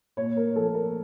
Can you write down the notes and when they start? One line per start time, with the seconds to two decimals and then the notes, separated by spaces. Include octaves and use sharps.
0.17 A#2 C#5
0.37 A#4
0.56 F3 A4
0.74 A#4